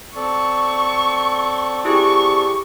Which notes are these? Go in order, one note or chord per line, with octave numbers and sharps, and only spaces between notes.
C4 A4 D5 C#6
E4 G4 G#4 C#6